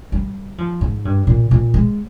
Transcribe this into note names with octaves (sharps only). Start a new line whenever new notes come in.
G3
F3
G#2
G2
A#2
A#2
G#3